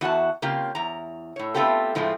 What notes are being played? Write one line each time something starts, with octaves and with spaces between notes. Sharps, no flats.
E2 F#4 F#5 A5
C#3 A#3 C4 F4 G4
E2 A#5
A2 C#5
A3 B3 C4 F4 G4 A4
A2 F3 G#3 A3 C4